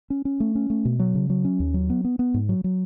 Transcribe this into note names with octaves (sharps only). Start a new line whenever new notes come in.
C#4
C#4
A3
C#4
A3
B2
F#3
C#3
F#3
C#4
D#2
F#3
B3
B3
B3
G#2
F#3
F#3